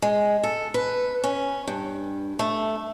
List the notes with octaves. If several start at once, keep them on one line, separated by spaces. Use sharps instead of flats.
G#3
A4
B4
C#4
G2
A3